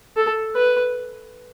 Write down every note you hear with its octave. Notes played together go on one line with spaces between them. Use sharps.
A4
B4